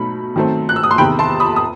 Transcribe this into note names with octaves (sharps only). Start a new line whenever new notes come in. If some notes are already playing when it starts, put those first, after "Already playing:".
Already playing: B2 F#3 A3 D#4 B5
D#3 F#3 A3 C4
F#6
E6
D#6
C6
E2 C3 D#3 G5 B5
A5 C6
B5 D#6
D#6